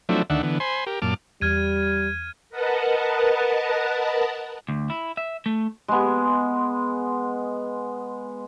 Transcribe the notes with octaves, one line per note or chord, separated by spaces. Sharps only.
F3 F#3 A3 C4 D4 E4
D2 D#3 D4 E5 F#5
D3 E3 B3
C5 G#5 B5 C6
G4 A#4
F#2 A#2 A5 D6 F6
E2 G3 F6 G#6 D#7
A#4 B4 D#5 F#5 A5
D2
E4
E5
A3
G#3 B3